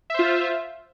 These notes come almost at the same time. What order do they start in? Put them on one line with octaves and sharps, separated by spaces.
E5 C5 F4